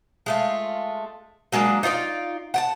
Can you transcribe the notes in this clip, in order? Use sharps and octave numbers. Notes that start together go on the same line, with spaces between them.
G#3 A3 F4
F#3 G#3 A#3 D4
D#4 F4 C#5 D5
F#5 G5 A5